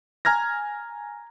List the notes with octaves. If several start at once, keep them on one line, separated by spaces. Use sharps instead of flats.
G#5 A#5 F6 G#6 A#6